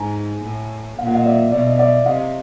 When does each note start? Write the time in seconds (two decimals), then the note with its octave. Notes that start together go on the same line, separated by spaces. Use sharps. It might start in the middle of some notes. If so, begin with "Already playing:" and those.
Already playing: G#2 G#5 A#5
0.45 A2
0.99 A#2 F5
1.07 F#5
1.15 D#5 F5
1.26 D5 E5
1.52 B2 D5 E5
1.67 D#5
1.79 D5 E5
2.06 C3 D#5 F5